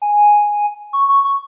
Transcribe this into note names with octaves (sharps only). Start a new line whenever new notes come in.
G#5
C#6
C#6
C#6